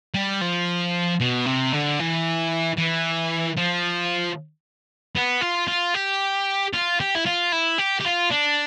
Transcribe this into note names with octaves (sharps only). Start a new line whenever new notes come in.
G3
F3
B2
C3
D3
E3
E3
F3
B3
F4
F4
G4
F4
G4
E4
F4
E4
G4
G4
F4
D4